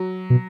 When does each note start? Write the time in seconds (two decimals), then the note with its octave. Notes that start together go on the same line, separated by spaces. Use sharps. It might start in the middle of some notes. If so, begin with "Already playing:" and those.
Already playing: F#3
0.30 B2